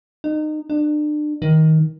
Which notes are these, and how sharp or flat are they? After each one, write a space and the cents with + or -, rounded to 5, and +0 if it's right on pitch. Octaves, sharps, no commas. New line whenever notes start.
D#4 -25
D4 +35
D#3 +20